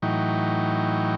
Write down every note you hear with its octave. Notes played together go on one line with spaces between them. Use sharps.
A2 E3 F#3 D#4 G5